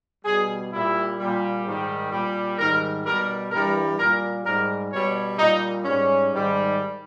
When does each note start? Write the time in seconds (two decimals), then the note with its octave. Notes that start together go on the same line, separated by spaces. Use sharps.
0.25 B2 G3 G#4
0.72 A#2 G3 E4
1.19 A#2 G3
1.65 G#2 D#3 G3
2.12 A#2 G3
2.58 G#2 D#3 G3 A#4
3.05 B2 G3 A#4
3.52 G2 E3 G3 A#4
3.98 A#2 G3 A#4
4.45 G#2 G3 A#4
4.91 B2 G3 C#5
5.38 A#2 G3 D#4
5.85 G#2 G3 C#4
6.32 G#2 D#3 G3